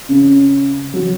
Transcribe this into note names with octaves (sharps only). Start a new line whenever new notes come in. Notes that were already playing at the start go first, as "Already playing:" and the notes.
C#3
F#3